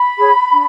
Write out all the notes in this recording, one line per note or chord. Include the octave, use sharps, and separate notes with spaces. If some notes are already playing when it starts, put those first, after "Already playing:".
Already playing: B5
G#4 C#5
D4